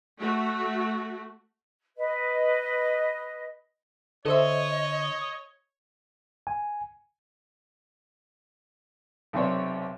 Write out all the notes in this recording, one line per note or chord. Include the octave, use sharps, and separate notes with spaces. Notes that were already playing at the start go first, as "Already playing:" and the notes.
A3 F#4
B4 D#5
D3 A4 C5 C#5 D#5 E5
G#5
B1 C3 C4 C#5 D5